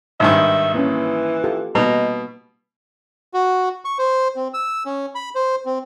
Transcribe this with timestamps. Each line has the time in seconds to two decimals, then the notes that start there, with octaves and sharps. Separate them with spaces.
0.20 G#1 G2 D#3 E5
0.74 E3 A#3 C#4
1.44 F4 G4 A4
1.75 B2 G3 A#3 B3 D#4
3.34 F#4
3.85 C#6
3.99 C5
4.36 C4
4.54 E6
4.85 C#4
5.15 B5
5.35 C5
5.66 C4